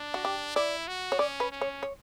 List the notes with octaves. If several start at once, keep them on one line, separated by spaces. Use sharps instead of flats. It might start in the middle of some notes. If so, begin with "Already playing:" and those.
Already playing: D4
F#4
G4
E4 D5
F#4
C#5
C#4 D5
B4
C#4
C#5
C#5